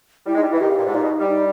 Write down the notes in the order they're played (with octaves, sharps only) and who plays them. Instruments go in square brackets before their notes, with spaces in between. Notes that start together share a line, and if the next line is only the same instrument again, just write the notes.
[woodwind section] G3 [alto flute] E4
[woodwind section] G#3
[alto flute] D#4
[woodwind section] G3
[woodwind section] E3 [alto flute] E4
[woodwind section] D#3 [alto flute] G4
[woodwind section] C#3
A#2
G#2
[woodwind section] A#2 [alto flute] D#4
[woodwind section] B2
G3
[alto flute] D#4